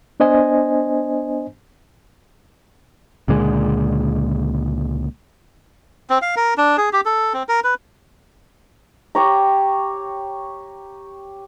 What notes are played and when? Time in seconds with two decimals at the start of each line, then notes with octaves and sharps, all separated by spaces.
0.20 B3 D4 C5 D#5 G#5
3.28 C#2 A#2 D3 G#3
6.10 C4
6.22 F5
6.36 A#4
6.58 D4
6.78 G#4
6.93 G4
7.06 A4
7.34 C4
7.49 A#4
7.64 B4
9.15 G4 C#5 A#5